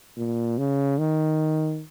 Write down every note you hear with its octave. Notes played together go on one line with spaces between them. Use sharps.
A#2
C#3
D#3